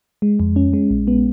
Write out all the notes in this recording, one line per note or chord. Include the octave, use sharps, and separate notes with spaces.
G#3
F2
C#4
G#3
A#1
B3